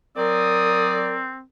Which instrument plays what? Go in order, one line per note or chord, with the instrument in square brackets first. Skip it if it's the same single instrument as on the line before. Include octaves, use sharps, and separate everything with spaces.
[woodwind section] F#3 D5 [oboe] C4 [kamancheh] A#4 [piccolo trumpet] D#6